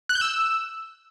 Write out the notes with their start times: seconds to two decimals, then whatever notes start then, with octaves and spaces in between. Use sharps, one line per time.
0.09 F#6
0.15 G6
0.21 E6